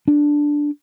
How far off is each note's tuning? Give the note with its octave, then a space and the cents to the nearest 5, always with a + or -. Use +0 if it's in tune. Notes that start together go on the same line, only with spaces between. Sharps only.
D4 +0